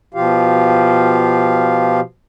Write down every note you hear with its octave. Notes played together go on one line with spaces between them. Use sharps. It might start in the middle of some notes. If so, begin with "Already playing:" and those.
B2 F3 F4 G4 F5